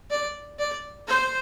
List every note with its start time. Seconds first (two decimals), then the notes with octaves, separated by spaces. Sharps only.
0.10 D5
0.59 D5
1.08 C5